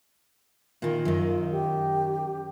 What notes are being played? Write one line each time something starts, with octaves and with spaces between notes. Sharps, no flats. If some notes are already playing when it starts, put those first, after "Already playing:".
A#2 D#3 F4
F#2 D#3
G4